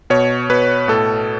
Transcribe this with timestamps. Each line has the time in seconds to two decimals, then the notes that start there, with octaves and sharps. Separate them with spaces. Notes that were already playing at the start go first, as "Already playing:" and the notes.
0.10 B2 C#5
0.50 B2 B4
0.88 A2 A4